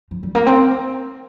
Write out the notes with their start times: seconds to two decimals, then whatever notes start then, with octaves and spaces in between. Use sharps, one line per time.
0.11 F3
0.23 G3
0.35 A#3
0.46 C4